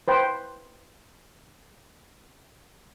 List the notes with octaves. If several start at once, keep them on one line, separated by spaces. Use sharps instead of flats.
B4 C5 G5